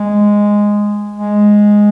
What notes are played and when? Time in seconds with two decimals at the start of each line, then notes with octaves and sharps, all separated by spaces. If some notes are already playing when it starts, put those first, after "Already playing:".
Already playing: G#3
1.16 G#3